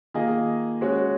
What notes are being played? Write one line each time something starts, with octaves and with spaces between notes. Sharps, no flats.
D#3 A#3 F4 G#4 D#5
G#3 C#4 F#4 C#5